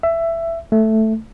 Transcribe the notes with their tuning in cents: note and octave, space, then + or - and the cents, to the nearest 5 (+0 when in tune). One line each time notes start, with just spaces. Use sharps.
E5 +15
A3 +0